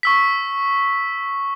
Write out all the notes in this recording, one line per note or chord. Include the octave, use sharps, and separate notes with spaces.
C#6 E6 B6